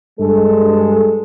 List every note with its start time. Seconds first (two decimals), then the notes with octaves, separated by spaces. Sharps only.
0.20 G2 G#3 A4